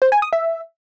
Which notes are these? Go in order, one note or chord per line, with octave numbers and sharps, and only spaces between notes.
C5
G#5
D#6
E5